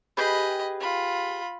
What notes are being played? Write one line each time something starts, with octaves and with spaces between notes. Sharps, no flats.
G4 G#4 B4 D#5 B5
F4 B5